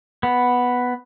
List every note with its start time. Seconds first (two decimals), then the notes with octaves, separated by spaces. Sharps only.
0.23 B3